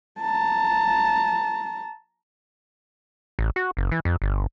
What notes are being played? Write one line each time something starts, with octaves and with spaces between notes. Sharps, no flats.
A5 A#5
A1
F#4
F#1
E3
F2
G1